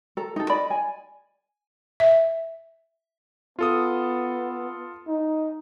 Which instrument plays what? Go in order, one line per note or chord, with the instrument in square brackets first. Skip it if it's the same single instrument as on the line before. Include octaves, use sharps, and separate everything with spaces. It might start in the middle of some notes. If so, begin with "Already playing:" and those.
[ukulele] A4 A#5
D#4 A4
D5 D#5 B5
G#5
[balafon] E5
[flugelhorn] B3 [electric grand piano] F4 A4 D#6
[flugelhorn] D#4